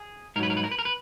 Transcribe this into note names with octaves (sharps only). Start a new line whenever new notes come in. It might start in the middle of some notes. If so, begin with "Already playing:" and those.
Already playing: G#4
G#2 F#3 A#4 B4
A#4
B4
A#4
B4
A#4
B4